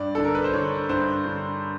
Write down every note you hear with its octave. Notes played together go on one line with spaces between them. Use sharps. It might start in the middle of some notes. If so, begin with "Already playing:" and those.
Already playing: G2 D5
D3 A4
A#4
B4
C5
D3 C#5
G2 C5
D3